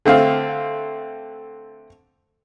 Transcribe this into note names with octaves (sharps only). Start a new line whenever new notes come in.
D3 A3 C4 F5